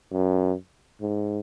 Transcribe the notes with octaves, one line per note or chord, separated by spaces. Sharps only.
F#2
G#2